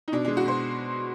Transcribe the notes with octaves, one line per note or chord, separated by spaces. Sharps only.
D#4
B2 D4
G#3 D4
F#4
B2 C5